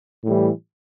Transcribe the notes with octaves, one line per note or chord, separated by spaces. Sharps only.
A2 E3 G3